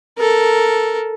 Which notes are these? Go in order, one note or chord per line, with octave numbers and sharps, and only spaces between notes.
A4 A#4